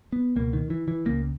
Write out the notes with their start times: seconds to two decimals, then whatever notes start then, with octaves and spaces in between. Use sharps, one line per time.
0.12 B3
0.36 C#2 B2 A#3
0.53 D#3
0.70 E3
0.88 E3
1.05 C#2 C#3 A#3